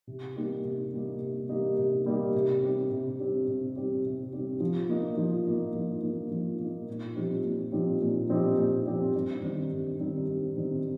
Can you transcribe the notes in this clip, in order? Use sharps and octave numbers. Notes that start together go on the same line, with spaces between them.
C3
G3 A#3 D#4 G4
C3
G3 A#3 D#4 G4
C3
G3 A#3 D#4 G4
C3
G3 A#3 D#4 G4
C3
G3 C4 G4
C3
G3 C4 G4
C3
G3 C4 G4
C3
G3 C4 G4
F3
A#3 D#4
F3
A#3 D#4
F3
A#3 D#4
F3
A#3
D#4
A#2
F3 C4 D#4 G4
A#2
F3 C4 D#4 G4
A#2
F3 C4 D#4 G4
A#2
F3 C4 D#4 G4
G2
D#3 G3 C4 D#4
G2
D#3 G3 C4 D#4
G2
D#3 G3 C4 D#4